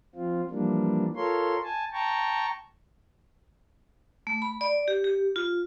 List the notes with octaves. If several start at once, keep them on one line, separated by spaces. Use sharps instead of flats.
F3 C4 F4
E3 F3 G3 A#3 D4
F4 A4 A#4 C#5 C6
G#5 A5
G5 A5 A#5 C#6
A3
B5
D5
G4
G4
F4